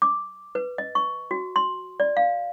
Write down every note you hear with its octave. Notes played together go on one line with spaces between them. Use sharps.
D6
B4
D#5
C#6
F#4
C6
D5
F5